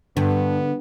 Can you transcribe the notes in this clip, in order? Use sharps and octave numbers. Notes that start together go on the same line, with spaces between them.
G2 D3 B3